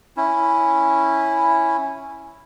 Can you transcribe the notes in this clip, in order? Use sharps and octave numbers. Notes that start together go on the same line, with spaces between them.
C#4 E4